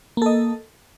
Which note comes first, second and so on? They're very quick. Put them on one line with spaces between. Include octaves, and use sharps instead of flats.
A#3 A4 D#5